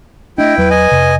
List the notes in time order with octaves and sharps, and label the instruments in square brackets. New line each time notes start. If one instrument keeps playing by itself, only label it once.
[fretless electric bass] A3 D4 [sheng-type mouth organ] E4 G5 [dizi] D#5
[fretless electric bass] E2 F#3 [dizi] B4
[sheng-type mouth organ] D#5 G#5
[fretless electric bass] F2 C3